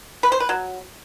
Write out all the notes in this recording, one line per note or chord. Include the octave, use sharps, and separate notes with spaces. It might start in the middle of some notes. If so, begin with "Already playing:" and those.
B4
C5
B4
F#3